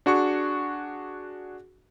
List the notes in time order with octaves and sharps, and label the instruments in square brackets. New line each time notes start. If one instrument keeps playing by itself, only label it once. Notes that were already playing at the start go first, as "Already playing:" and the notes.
[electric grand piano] D4 F#4 G#4 C#6